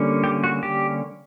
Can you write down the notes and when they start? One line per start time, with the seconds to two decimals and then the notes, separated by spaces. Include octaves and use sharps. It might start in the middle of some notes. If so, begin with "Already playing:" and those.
Already playing: D3 G3 A#3 C#4
0.24 G4
0.44 F#4
0.63 G4